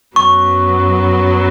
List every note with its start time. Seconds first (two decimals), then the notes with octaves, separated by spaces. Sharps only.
0.16 F#2 F#3 B3 C#6